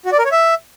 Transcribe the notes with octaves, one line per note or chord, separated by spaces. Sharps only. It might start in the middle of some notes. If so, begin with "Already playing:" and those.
F#4
D5
A#4
C#5
E5